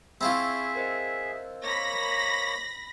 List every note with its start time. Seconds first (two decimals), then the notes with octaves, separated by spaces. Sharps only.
0.21 C4 E4 F4 G#4 E5 B5 C#6
0.75 A#4 C5 D#5
1.63 A#3 C#5 B5 A#6